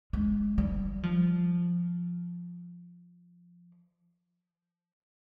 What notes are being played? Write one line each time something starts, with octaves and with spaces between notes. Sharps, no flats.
G#3
G3
F3